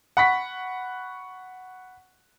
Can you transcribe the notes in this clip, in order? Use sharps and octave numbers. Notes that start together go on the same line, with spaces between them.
F#5 B5 C#6 B6